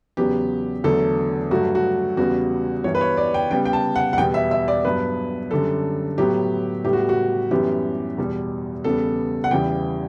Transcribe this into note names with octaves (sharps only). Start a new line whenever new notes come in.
E2 C#3 F#3 B3 G4
E2 D3 F#3 A3 A4
G2 F#3 A3 F#4
F#4
E2 C#3 G3 B3 F#4
G2 E3 G3 B3 C#5
B4
C#5
D5
G5
C#3 G3 B3 G5
G5
A5
F#5
F#5
E2 B2 G3 B3 G5
E5
E5
D5
G2 F#3 B3 B4
F#2 D3 G3 A4
A2 F#3 B3 G4
A2 G3 B3 G4
F#4
F#4
F#2 E3 G3 B3 G4
E2 B2 G3
E2 C#3 G3 B3 A4
F#5
E2 C#3 E3 G3 B3 G5